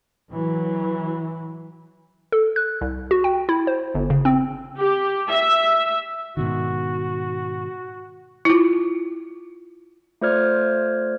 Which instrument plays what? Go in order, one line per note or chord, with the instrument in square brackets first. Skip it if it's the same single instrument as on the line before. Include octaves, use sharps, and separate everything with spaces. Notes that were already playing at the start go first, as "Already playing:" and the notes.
[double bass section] E3 F#3
[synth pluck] A4
F#6
C2
F#4
G5
E4
C5
G1
C#3
C4
[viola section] G4
E5
[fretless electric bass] G#2 B2 D#3 [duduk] F#4
[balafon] E4 F4
[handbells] A3 F4 C5 D5 F6 G#6